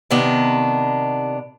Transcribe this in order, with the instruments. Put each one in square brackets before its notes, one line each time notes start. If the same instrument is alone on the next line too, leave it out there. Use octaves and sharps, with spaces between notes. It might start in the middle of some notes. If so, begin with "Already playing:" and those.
[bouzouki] C3 D#3 B3 D4